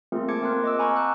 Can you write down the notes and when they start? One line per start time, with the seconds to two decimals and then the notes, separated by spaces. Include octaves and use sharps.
0.12 A3 A#3 C4 F4 G#4 A#4
0.29 A5 D6 G#6 C#7
0.42 A#3 C4 A#4 C6 F#6
0.64 D#5 D6 E6
0.79 G#5 A#5 B5 C#6 D6 G6
0.94 F#5 A5 E6 F#6